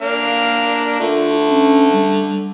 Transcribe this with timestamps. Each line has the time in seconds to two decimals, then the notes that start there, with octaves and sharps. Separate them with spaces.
0.02 A#3 D4 F5
1.00 D3 A3 F4
1.49 C#4
1.92 G3